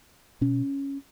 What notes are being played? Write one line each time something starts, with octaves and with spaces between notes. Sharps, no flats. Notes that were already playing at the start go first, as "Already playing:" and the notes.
B2 C#4